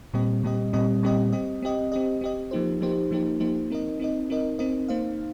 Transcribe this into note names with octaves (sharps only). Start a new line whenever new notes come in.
A#2 G3 C4 G4 D#5
A#2 G3 C4 G4 D#5
A#2 G3 C4 G4 D#5
A#2 G3 C4 G4 D#5
C4 G4 D#5
C4 G4 D#5
C4 G4 D#5
C4 G4 D#5
F3 A#3 D#4 G4 C5
F3 A#3 D#4 G4 C5
F3 A#3 D#4 G4 C5
F3 A#3 D#4 G4 C5
C4 D#4 A#4 D#5
C4 D#4 A#4 D#5
C4 D#4 A#4 D#5
C4 D#4 A#4 D#5
A#3 D#4 C5 F5